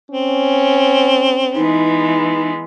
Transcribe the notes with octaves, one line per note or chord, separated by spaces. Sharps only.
C4 C#4
E3 G#3 B3 D#4